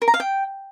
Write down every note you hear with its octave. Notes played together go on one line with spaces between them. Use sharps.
A#4
A#5
F5
G5